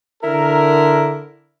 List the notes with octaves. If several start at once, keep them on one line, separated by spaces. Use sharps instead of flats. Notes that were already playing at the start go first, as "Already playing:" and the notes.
D3 E4 A#4